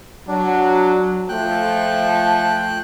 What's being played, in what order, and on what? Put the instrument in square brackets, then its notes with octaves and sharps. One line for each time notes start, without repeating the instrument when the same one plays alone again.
[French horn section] F#3 [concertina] D4
[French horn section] F3 A3 [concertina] G5 F#6